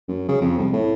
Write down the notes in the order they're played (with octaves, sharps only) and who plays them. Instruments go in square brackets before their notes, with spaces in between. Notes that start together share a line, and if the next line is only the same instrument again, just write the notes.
[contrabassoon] F#2
C#3
F2
C2
A2